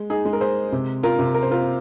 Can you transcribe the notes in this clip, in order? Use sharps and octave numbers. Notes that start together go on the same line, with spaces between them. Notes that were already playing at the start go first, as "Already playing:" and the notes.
Already playing: G#3
D#4 G#4
G#3
A#4
G#4 C5
C3
F4 A#4
C3
A#4
C5
F4 A#4